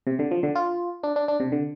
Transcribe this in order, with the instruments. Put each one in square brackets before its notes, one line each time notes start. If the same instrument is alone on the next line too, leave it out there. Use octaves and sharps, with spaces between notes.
[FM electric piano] C3
D3
F3
D3
F4
D4
D4
D4
C3
D3